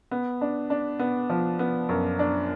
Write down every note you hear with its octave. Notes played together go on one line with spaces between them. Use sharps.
B3
D4
D4
B3
F3
B3
F#2
D4